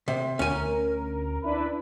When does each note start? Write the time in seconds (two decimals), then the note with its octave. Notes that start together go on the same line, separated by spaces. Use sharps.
0.08 C3
0.39 D2 C#4 A#4 G#5
1.42 D4 E4 B4